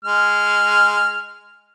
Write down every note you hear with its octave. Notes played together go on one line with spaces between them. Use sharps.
G#3 F6